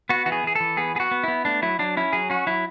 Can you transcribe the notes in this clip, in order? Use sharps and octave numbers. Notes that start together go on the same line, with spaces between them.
B3 F#4
E3 F#4
G#4
E3 G#4
E3 A4
B3 G#4
B3 F#4 G#4
B3
B3 E4
A3 D4
F#3 E4
F#3 D4
C#4 E4
F#3 G#4
C#4 F#4
F#3 E4